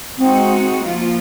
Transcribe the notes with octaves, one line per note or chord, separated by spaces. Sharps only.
G#3 C4 D#4 F#4
F3 A#3 F4